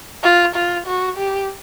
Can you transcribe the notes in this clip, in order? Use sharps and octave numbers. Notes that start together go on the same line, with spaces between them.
F4
F4
F#4
G4